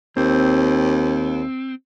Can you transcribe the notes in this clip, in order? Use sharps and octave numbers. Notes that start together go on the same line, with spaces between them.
D#2 C4